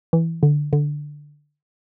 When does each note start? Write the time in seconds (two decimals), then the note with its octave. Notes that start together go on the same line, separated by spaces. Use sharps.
0.13 E3
0.43 D3
0.73 D3